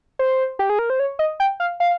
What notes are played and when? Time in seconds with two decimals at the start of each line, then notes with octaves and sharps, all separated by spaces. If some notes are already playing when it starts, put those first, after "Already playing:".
0.19 C5
0.59 G4
0.70 G#4
0.79 A#4
0.90 C5
1.00 C#5
1.19 D#5
1.40 G5
1.60 F5
1.80 F5